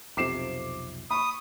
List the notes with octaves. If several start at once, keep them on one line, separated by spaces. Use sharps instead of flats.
B1 F2 C3 D6 C7 E7
B5 C#6 D#6